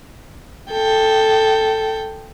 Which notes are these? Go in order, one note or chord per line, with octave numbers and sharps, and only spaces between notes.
A4 G5